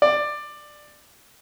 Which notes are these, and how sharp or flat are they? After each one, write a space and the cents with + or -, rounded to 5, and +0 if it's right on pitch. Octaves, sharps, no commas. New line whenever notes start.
D5 +15